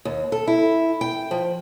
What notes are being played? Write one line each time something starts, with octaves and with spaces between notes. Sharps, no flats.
D#2
A4
E4
G5
F3